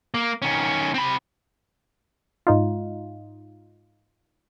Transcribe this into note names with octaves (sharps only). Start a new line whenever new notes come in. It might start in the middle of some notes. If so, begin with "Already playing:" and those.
A#3
D#3 C#4
C4 B5
G#2 D#4 F4